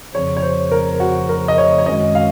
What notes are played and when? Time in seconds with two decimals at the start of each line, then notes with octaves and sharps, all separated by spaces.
0.14 F2 C#3 F3 C#5
0.37 C#5
0.42 C5
0.71 A#4
1.00 F#4
1.29 A#4
1.48 D#5
1.58 C#5
1.78 C#5
1.86 F#2 D#3 G#3 C#4 F#4 D#5
2.15 F5